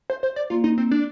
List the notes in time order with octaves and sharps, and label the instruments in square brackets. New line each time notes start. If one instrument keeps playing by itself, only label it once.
[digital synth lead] C5
C5
D5
[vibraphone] A#3 [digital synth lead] F4
[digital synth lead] D#4
C4
D4